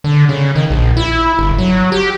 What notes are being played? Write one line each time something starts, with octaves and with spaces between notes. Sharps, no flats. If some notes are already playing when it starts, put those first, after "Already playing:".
D3
C#3
D#3
A#1
E4
G1
F#3
G4